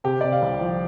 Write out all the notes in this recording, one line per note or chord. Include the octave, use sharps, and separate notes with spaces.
C3 G4
C3 D5
F5
C2
F3